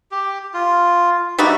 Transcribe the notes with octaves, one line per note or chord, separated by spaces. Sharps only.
G4
F4
G3 D#4 F#4 D5 E5